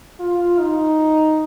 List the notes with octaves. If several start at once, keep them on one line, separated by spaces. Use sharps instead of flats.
F4
D#4